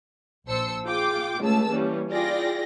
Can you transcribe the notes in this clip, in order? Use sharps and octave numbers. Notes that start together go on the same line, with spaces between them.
A#1 C5 A5 E6 C#7
F4 G#4 G5 D6
C#2 C#3 A3 G#4 A5 E6
E3 G3 A#3 C#4
E4 F4 G#4 D5 G5 A#6